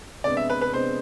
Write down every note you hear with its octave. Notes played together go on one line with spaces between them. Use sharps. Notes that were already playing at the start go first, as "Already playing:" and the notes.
C3 G#3 B3 D4 D5
E5
B4
B4
C3 G#3 B3 D4 C5